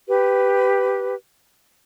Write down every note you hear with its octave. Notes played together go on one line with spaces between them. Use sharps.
G4 B4